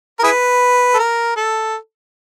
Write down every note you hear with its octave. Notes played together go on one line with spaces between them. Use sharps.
A#4
E4 G#4 B4
A4
A#4
A4